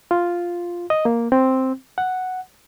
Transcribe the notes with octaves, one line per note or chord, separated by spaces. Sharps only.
F4
D#5
A#3
C4
F#5